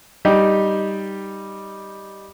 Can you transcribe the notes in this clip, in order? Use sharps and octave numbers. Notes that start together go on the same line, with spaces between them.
G3 D#4 G4